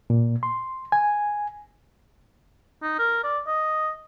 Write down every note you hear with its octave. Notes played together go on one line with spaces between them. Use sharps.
A#2
C6
G#5
D#4
A#4
D5
D#5